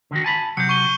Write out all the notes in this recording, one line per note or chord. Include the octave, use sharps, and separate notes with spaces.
D3 D#3 F#4
G#5 A5 B5
C3 F#3 G6 C#7
C#6 D#7 G7